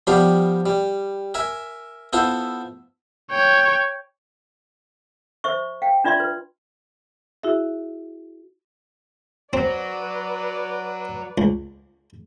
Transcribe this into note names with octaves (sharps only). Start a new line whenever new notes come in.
F3 G3 B3 G4 D5 F5
G3
A#4 E5 G#5
B3 E4 F4 A4 C5
C#5 G5
C5 E5 C#6
F5 G5
D4 F4 D5 E5 C6
B4
E4 F#4 G#4 E5
F#3 C4 B4 D5
C#2